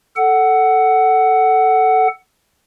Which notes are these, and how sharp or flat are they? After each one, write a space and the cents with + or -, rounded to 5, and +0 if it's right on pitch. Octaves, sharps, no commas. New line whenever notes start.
A4 +0 F#5 +15